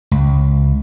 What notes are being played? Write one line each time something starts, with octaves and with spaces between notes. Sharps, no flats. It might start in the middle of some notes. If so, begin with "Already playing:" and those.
C#2